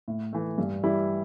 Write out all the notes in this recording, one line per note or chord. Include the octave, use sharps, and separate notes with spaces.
A2
E3 A3
G2
E3 G3 E4